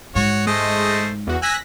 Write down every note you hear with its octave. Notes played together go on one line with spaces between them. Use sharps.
G#2 F#4 C#5
G#3 A3 C5 D#5
E2 F#4
G#5 E6 F#6 A#6 B6